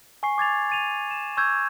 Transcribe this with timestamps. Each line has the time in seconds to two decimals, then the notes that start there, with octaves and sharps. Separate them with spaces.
0.23 G#5 C#6 C7
0.38 D6 G#6 A6 F7
0.70 A6 D#7 F7
1.11 E7
1.37 C#6 E6 G6 G#6